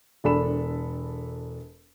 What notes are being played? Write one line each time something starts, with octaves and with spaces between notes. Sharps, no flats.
E1 D4 A4 B5 E7